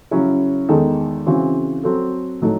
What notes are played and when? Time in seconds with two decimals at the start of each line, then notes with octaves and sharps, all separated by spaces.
0.11 C#3 F#3 C#4 E4
0.69 E2 D#3 G#3 D#4 A4
1.26 C#3 E3 C4 F#4
1.83 F#3 C4 F#4 A4
2.41 A2 F#3 A3 D#4 A4